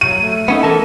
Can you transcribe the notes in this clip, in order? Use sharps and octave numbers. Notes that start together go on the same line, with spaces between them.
F#3 D#7
A3
A3 B3 C#4 D#4
E3 A4 A#4 A5